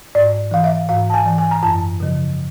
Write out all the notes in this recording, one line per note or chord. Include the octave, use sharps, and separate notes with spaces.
G#2 D5
E3 F5
E5
G#2 F5
A5
G#5
E3
G#5
A#5
F#2 A5
C#3 F3